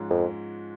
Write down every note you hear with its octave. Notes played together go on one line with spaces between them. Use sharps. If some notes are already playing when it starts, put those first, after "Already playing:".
Already playing: G#2 F3 G#3 C#4 F4
F2